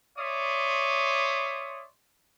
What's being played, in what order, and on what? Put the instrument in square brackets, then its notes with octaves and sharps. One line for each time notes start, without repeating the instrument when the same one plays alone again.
[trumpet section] C#5 D5 E5 C6 D#6